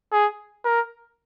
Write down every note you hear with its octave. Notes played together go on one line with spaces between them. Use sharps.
G#4
A#4